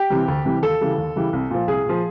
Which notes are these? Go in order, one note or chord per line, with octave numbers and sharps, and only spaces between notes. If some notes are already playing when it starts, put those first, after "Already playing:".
Already playing: G4
C3 E3 G3
D2
C3 E3 G3
D#2 A4
C#3 E3 G3
D#2
C#3 E3 G3
C2
A#2 F3
C2 G#4
A#2 F3